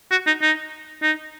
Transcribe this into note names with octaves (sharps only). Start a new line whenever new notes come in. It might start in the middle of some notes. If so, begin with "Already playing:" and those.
F#4
D#4
D#4
D#4